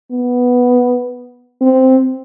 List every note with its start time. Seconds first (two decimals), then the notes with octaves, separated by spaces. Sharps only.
0.11 B3
1.62 C4